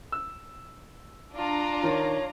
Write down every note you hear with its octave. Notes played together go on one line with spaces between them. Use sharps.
E6
D4 F4 A#5
D#3 C#5